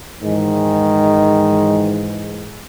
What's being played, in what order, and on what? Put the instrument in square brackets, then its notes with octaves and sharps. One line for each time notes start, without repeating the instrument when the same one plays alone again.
[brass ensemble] G#2 E3 G#3 [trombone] D#3